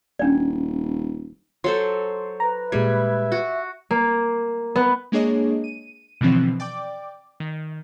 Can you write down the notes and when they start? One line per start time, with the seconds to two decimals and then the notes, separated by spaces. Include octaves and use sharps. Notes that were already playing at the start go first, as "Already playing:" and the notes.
0.19 D#1 C#4 D4 D5
1.64 F#3 A4 C5 C6
2.40 B4 A#5
2.72 A#2 G3 G#3 E5 G#6
3.32 F#4
3.91 A#3
4.76 B3
5.12 G#3 A#3 D4 G#4 C#5 D#5
5.64 D#7
6.21 B2 D3 E3 F3 C4
6.60 D5 G5 D6
7.40 D#3